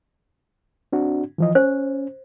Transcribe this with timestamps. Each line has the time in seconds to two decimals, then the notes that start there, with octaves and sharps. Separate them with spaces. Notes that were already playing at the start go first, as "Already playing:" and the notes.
0.92 C4 D4 F#4
1.38 E3 F3 D#5
1.55 C#4 C5